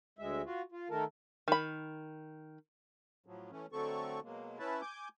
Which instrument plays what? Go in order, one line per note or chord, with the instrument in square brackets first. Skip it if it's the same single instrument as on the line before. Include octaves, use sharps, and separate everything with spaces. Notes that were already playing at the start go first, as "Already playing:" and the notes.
[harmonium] D2 G#3 E5
F4 F#4
F4
D#3 A3 A4 A#4
[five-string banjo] D#3 B5
[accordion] A2 F3 F#3
E3 A3 C#4
D3 F#3 A3 C4 A4 C#6
B2 F#3 G#3 A#3
C#4 E4 B4 E5 A5
G#5 D6 G6